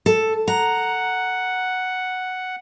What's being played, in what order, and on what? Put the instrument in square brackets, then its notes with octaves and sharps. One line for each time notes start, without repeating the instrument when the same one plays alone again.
[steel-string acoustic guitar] A4
[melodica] F#5 [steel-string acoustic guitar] A#5